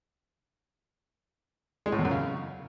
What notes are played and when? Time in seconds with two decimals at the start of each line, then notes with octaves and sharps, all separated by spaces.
1.86 G#3
1.92 A2
1.98 E2
2.05 F#2
2.11 C#3